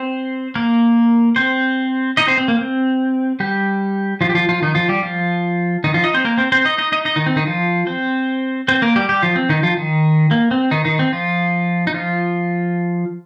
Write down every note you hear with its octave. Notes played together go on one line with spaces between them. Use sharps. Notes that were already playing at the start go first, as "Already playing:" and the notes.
Already playing: C4 C5
A#3 A#4
C4 C5
D#4 D#5
C4 C5
C4
A#3
C4
G3 G4
F3 F4
G4
F3 F4
F3 F4
D#3 D#4
F3 F4
G3 G4
F3 F4
D#3 D#4
F3 F4
D#4 D#5
C4 C5
A#3 A#4
C4 C5
C4 C5
D#4 D#5
D#4 D#5
D#4 D#5
D#4 D#5
D#3 D#4
C4
D#3 D#4
F3 F4
C4 C5
C4 C5
A#3 A#4
G3 G4
G3 G4
F3 F4
C4
D#3 D#4
F3 F4
D#3 D#4
A#3
C4
D#3 D#4
D#3 D#4
C4
F3 F4
D#4
F3 F4